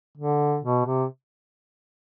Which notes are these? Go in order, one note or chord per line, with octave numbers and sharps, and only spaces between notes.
D3
B2
C3